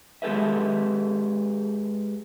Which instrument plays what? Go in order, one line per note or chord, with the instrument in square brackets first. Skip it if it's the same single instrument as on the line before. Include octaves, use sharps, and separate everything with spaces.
[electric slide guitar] G#3 G4 A4 B4 E5